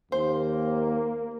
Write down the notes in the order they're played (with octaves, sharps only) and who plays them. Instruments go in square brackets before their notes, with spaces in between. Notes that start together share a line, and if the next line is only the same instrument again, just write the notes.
[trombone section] D#2 [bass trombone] A#3 [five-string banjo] C5